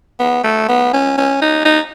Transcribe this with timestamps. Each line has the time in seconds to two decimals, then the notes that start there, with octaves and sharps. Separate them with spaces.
0.20 B3
0.44 A3
0.69 B3
0.94 C#4
1.18 C#4
1.42 D#4
1.65 D#4